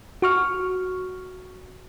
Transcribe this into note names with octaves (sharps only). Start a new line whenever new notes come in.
F#4 C#6 F6